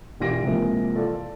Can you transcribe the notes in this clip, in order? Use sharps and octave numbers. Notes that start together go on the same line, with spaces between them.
E1 E3 F4 G4 A#6 D7
C3 E3 F3 G#3 A#3
F4 A4 D5